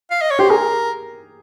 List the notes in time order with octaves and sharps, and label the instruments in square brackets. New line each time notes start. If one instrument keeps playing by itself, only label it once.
[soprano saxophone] F5
D#5
C#5
[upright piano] G4 [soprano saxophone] C5
[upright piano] G#4 [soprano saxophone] A#4